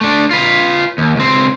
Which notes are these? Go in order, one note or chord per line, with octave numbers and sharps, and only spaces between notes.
A3 D4
F4 B4
D#2
C#2 C4